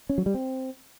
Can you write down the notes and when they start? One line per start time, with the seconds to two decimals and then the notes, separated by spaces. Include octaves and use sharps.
0.09 C#4
0.18 F#3
0.26 G3
0.34 C4